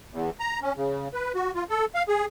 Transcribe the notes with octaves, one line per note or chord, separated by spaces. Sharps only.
E2
A#5
C#4
C#3
B4
F#4
F4
A4
F5
G#4